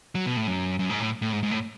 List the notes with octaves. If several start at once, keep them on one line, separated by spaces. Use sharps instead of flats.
F#3
B2
A2
F#2
F#2
G#2
A2
A2
G#2
G#2
A2